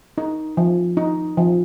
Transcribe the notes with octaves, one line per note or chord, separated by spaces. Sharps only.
D#4
F3
D#4
F3